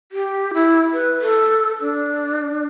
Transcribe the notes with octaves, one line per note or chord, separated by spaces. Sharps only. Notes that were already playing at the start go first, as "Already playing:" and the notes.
G4
E4
B4
A4
D4